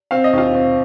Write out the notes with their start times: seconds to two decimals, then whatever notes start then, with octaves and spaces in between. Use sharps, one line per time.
0.11 C4 F5
0.24 D#5
0.33 D#2 F4 F5
0.55 C4